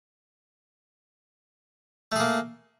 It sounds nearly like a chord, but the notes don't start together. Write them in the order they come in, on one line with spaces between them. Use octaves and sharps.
A3 G#4 A#3